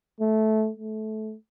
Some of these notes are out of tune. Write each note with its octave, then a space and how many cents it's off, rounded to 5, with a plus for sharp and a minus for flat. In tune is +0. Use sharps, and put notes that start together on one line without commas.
A3 -15
A3 -20